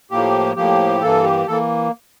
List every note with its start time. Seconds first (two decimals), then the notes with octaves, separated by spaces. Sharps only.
0.11 A2 F3 A#3 G4
0.56 A2 F3 A#3 G4
1.01 G2 E3 A#3 A4
1.24 G4
1.47 E3 A#3 A4